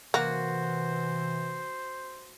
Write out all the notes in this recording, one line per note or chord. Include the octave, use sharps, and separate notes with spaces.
C3 E3 A#3 F#4 C5